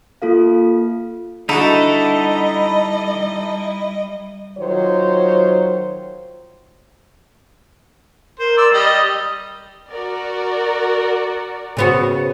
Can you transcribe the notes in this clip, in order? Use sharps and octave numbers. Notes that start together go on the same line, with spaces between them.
A#3 F4 A4 F5
D3 G3 D#4 E4 F#4 A4 D#5
D#3 F#3 F4 C5 C#5
A#4 C5
D5 E6
G3 D#5 D#6
F#4 A#4 D5
C#3 B3 F#4